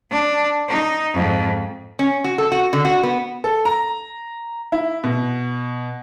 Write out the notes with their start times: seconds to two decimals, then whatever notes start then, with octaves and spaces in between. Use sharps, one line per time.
0.10 D4
0.68 D#4
1.14 F2 G#2
1.99 C#4
2.24 F#4
2.38 A4
2.52 F#4
2.73 D3
2.85 F#4
3.03 B3
3.44 A4
3.65 A#5
4.72 E4
5.04 B2